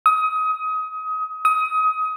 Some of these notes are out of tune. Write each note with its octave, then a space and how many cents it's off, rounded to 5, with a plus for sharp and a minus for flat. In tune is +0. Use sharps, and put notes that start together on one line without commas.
D#6 +25
D#6 +25